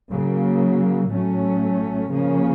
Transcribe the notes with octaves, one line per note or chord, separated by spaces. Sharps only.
C#3 F#3 A#3
A2 F#3 A3 C#4
C#3 F3 A#3 C#4